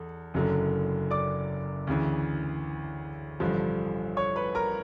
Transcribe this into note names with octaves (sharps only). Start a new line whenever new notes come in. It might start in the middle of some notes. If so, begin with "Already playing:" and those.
Already playing: E2 A4
F#1 F#2 D3 F#3
D5 D6
D2 C#3 E3
A1 G2 D3 F3
C#5 C#6
B4 B5
A#4 A#5